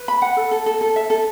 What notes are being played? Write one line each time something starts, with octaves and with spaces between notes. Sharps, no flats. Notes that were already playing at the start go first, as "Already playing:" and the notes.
Already playing: B4
B5
F#5
A4
A4
A4
A4
E5
A4